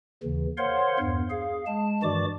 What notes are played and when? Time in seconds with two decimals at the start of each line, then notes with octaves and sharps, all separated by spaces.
0.23 D#2 C#3 E3
0.58 A#4 C5 C#5 F5 F#5 C6
0.99 E2 G2
1.30 G#4 F5
1.67 G#3 A5
2.03 G2 D#3 E3 F#4 D5 D6